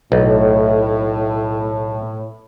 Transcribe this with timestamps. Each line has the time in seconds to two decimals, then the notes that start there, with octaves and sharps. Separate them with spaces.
0.12 B1 A2